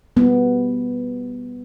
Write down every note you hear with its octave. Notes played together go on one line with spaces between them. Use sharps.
G3 B3